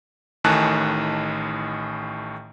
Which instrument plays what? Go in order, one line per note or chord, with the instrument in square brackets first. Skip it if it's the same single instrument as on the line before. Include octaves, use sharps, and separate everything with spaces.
[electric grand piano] A1 A2 D#3 G#5 A5 F#6